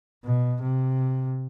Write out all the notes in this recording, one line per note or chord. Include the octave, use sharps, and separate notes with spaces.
B2
C3